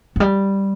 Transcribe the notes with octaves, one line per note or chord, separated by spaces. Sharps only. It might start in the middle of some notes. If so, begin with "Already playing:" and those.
F#3
G3